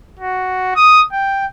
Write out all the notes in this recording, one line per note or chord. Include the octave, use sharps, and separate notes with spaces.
F#4
D#6
G5